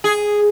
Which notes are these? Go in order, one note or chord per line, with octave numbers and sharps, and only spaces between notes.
G#4